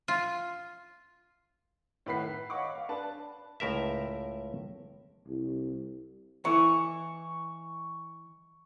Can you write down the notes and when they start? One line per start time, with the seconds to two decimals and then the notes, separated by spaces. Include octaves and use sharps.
0.08 F4
2.06 A2 D#3 B4 F#5 B6 C7
2.23 B4
2.50 C#5 D#5 F5 F#5 C#6 D6
2.75 F5
2.89 D4 B4 A5
3.60 C#2 A2 A#4 E5
5.28 C2
6.45 E3 C#6